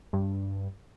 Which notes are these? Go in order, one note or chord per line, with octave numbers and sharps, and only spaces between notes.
G2